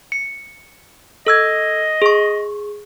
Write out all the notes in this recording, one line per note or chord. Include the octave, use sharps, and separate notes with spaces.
C#7
A4 D#5 E6 G#6
G#4 C#6